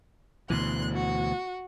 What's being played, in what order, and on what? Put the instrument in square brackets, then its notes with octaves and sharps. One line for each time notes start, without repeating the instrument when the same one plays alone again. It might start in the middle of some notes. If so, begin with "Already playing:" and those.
[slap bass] D2 B2 E3 [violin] C6 F#6
[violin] F#4